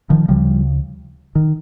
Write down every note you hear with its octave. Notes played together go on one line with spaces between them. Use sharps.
D#3 F3
D2 C#3 F3 G3
D#3